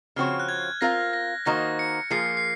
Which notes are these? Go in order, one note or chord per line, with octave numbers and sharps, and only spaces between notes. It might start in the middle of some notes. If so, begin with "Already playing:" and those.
C#3 F3 C4 F#4 C#5 F6
F#6
G#6
C4 F4 A#4 F5 A#6
A#6
D#3 A#3 D#4 F#4 C5 A#6
C#7
F3 A#3 F4 G#4 C7
C7